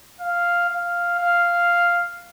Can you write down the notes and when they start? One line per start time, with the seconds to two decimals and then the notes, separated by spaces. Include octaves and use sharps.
0.21 F5
0.69 F5
1.18 F5